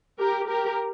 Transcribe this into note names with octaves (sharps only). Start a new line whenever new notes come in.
G4 A#4
G4 A#4